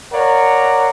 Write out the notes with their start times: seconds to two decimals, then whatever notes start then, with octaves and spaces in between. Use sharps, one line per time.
0.12 A#4 C#5 D5 F5 F#5 A#5